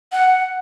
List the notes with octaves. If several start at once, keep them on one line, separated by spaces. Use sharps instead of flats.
F#5